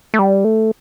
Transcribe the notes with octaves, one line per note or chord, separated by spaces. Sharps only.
A3
G3
A3